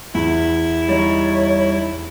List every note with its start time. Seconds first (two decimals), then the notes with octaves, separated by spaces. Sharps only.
0.15 E2 E4
0.89 G3 D#4 C#5